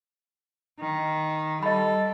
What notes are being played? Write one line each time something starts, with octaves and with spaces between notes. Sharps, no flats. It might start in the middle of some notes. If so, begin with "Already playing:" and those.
D#3
G3 A4 D#5 B5